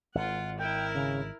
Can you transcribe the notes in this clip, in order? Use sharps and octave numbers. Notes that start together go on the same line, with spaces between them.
G#1 F4 F#5
E4 A#4 G5
C#3